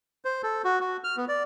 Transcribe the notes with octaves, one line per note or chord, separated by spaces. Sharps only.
C5
A4
F#4
F#4
F6
B3
D5